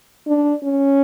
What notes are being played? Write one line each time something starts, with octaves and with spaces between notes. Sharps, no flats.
D4
C#4